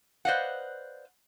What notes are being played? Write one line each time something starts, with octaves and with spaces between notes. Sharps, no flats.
B4 C5 D5 D#5 F5 F#5